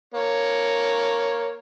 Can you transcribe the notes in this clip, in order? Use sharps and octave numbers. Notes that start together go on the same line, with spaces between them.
A#3 C#5